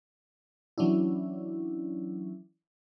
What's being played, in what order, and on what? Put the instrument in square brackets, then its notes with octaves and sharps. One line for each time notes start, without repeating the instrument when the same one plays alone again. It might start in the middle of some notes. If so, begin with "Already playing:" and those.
[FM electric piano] E3 F#3 C#4 D4 E4